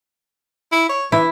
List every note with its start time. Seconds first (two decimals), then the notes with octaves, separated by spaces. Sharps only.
0.72 E4
0.89 C#5
1.12 E3 E4